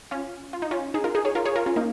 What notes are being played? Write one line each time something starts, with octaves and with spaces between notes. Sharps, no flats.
C#4 F4
F4
D#4
C#4 F4
D#4 G#4
F4 A#4
D#4 G#4
G#4 C#5
F4 A#4
G#4 C#5
F4 A#4
C#4 F4
A#3 D#4